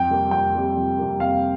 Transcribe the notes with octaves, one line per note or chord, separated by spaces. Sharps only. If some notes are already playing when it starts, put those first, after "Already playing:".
Already playing: F2 G5
C3 G3 A#3
F2 G5
C3 G3 A#3
F2
C3 G3 A#3
F2 F5